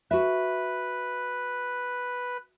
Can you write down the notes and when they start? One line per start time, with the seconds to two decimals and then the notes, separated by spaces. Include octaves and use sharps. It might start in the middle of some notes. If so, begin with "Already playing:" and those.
0.11 F#4 B4 E5